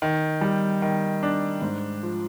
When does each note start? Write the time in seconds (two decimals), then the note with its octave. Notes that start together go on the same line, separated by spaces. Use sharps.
0.02 D#3
0.41 G3
0.82 D#3
1.23 D4
1.62 G#2
2.03 F3